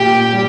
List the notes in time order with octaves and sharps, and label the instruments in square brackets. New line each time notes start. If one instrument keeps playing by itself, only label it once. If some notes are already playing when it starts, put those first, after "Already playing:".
Already playing: [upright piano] A#2 [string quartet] G4 G5
[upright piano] G3